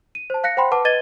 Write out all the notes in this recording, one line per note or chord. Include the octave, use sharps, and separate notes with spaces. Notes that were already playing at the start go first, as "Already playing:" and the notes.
D#7
C5 A5
F5 F#6 A#6 C#7
C5 F#5 G5 B5 C6
B4 F#5 A5 D6
B4 D#5 G#6 A6 D#7 G7